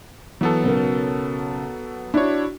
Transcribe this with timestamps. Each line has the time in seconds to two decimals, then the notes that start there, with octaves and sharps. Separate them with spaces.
0.41 E3 F#3 B3 A4
0.63 B1 C#3 A#4
2.14 D4 E4 F#4 C#5